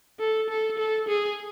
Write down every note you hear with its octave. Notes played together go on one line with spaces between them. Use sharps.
A4
A4
A4
G#4